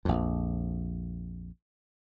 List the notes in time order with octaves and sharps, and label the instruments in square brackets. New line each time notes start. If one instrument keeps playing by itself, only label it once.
[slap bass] A#1 F2